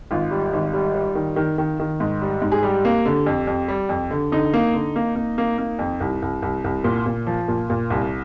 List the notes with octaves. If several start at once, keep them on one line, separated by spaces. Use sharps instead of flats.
G#1 F4
G3
G#1
G3
G3
D#3
D#3
D#3
D#3
G#2
G3
G#2
G#4
G3 G4
A#3
D3
F2
F2
G3
F2
D3
D3 D#4
A#3
D3
A#3
A#3
A#3
A#3
F2
C2
C2
C2
C2
A#2
A#2
F3
A#2
A#2
C2